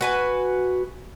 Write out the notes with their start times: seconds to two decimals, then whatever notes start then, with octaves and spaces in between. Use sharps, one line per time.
0.01 F#4 B4 G#5